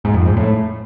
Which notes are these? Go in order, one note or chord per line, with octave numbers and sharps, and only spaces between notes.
G#2
F2
G#2
A2